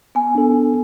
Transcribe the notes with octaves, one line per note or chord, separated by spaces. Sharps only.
B3 G#5
D4 A4